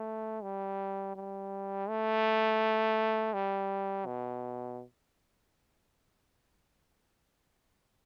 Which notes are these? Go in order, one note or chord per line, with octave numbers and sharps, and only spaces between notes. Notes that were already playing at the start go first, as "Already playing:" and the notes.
Already playing: A3
G3
G3
A3
G3
B2